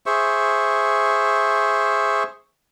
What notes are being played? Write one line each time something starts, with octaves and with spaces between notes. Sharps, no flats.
G#4 C5 E5 C#6